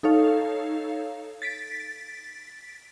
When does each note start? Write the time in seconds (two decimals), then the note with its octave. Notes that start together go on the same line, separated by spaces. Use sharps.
0.03 D#4 A4 C#5 F5
1.42 A6 B6 D7